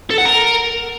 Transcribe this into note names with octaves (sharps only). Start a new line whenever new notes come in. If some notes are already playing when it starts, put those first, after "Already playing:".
A4
F#5
A#4